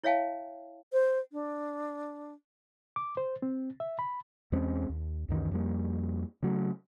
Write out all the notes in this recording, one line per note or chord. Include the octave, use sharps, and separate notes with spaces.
E4 C#5 E5 F5 G5 A5
C5
D4
D6
C5
C4
E5
B5
E2 G#3 C4 C#4
D#2
C#2 F#2 D#3 E3
F2 G3 A#3
C#3 F#3 A3